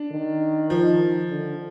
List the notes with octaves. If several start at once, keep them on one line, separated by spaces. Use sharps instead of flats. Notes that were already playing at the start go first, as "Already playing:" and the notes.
Already playing: D4
D#3
F3
D3